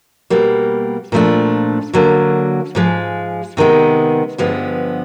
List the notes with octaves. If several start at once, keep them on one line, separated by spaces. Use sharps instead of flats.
B2 G3 A#3
A#2 F3 A3 D4
D3 F#3 A#3
G#2 F3 G#3
C3 D#3 G#3 B3
G2 D3 F3 G#3 B3